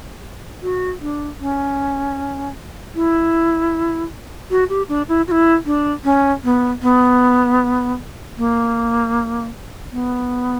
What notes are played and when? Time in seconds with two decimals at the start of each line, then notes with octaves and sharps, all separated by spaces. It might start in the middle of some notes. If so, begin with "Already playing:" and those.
0.62 F#4
1.01 D4
1.40 C#4
2.95 E4
4.50 F#4
4.69 G4
4.88 D4
5.08 E4
5.27 F#4
5.31 E4
5.65 D4
6.04 C#4
6.43 B3
6.82 B3
8.37 A#3
9.91 B3